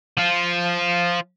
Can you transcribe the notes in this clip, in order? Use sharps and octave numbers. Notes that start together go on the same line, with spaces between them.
F3 F4